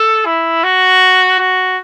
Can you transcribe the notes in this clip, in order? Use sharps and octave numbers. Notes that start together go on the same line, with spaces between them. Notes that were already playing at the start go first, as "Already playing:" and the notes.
Already playing: A4
E4
F#4
F#4